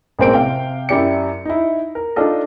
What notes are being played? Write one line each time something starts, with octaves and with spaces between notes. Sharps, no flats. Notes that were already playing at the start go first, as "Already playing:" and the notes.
A1 G#3 A#3 C4 C5 D7
C3 F5 G5
F#2 E4 G4 D5 C#7
D#4 E4
A#4
D4 D#4 F4 A4 D#5